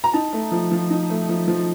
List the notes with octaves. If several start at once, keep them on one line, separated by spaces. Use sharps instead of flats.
A#5
D#4 A5
A3
F3
F3
D#4
A3
F3
F3